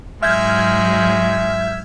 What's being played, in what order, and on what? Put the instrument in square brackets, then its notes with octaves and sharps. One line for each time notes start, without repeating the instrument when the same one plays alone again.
[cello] G#2 F#3 [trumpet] G#3 [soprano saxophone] E5 [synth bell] F6 G6 G#6